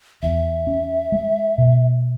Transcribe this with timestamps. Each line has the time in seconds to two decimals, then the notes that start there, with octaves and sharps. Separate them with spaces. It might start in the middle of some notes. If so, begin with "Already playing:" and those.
0.22 E2 E5
0.67 C#4
1.12 G#3
1.58 B2